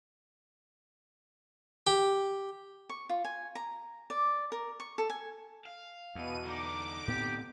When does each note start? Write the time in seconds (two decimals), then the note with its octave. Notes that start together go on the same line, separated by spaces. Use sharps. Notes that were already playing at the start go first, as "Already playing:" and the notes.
1.87 G4
2.89 C#6
3.09 F4
3.25 G#5
3.55 A#5
4.10 D5
4.52 A#4
4.80 C#6
4.98 A4
5.10 G#5
5.65 F5
6.15 E2 B2 D#7
6.45 D3 D#4 D6
7.08 A2 B3 C4 G4